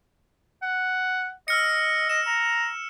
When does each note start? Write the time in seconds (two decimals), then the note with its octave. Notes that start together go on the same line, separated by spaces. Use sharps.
0.62 F#5
1.48 D#5 E6 F6 C#7
2.09 D#5 E7
2.27 A#5